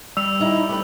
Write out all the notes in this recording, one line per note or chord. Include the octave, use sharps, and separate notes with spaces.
G3 E6 F7
D#3 D#4 E4
A3 B4